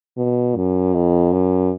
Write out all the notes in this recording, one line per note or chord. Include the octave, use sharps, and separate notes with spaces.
B2
F#2
F2
F#2